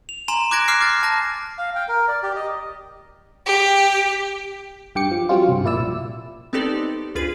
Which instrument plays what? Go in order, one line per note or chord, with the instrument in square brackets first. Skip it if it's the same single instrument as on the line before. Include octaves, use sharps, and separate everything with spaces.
[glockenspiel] F7
G#5 A#5 C6 E7
D6 F#6 G#6 A#6 D7
D6 F6 F#6 C7
D6 F#6 A6
A5 A#6
[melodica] F5
G5
A#4
D5
G4
D#5
[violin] G4
[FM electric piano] G2 G5 D6 C#7
F3
F#3 G3 C4 C#4 F4
C2 G2
A#1 A#2 E4 D5 E6
[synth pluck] B3 C4 D#4 G4 A4 D5
D2 F4 G#4 B4 D#7